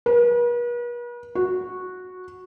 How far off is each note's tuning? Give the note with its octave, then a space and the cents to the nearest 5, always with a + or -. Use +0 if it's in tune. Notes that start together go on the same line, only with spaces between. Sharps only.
B4 -45
F#4 -10